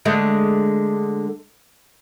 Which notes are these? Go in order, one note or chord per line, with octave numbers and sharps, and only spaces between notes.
D3 G#3 A3